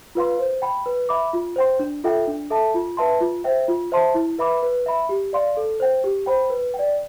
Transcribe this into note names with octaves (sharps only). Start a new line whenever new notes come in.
F4 B4 F5 C6
C5
G5 B5
B4
E5 B5 D6
F4
C5 G5 C6
D4
F4 A4 E5 G5
D4
A4 E5 A5
F4
B4 E5 A5 C6
F4
C5 E5 G5
F4
C5 E5 A5 C6
E4
B4 E5 B5 D6
B4
E5 B5
G4
D5 F5 C6
A4
C5 G5
G4
C5 G5 B5
B4
G5
D5